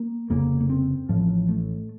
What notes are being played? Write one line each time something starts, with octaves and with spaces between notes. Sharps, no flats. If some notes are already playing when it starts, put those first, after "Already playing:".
Already playing: A#3
F1 F2 C#3 A#3
A#3
C4
A1 A2 F3
A3